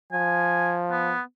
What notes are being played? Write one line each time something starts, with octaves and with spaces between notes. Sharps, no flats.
F3 G#5
B3